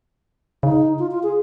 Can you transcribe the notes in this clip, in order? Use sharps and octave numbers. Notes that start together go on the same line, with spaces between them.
C#3 D#4
F4
F4
G#4